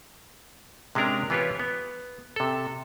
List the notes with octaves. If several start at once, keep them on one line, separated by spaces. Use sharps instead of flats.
C3 G#3 C#4 D4 A#4 A#5
E3 B3 F4 G4 B4 C#5
B3
C3 A4